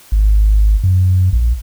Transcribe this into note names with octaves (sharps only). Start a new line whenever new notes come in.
G#1
F#2
A#1